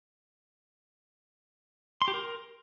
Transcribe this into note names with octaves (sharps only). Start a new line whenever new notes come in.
C6
G4
A#4